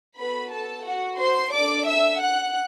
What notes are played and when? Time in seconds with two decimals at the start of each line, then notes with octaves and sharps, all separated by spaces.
0.18 B3 F#4 A4 B4 B5
0.52 A4 A5
0.86 F#4 F#5
1.19 C5 C6
1.53 D4 A4 D5 D6
1.88 E5 E6
2.22 F#5 F#6